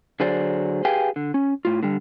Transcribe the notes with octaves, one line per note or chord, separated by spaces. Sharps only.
D3 F#3 G#4 C5 D5
G4 G#4 B4 F5 G5 G#5
D3
C#4
A2 F4
D3 G3